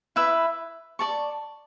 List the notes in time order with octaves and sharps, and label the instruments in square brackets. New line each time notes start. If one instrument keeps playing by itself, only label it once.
[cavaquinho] E4 B4 E5 B5
D5 A5 C#6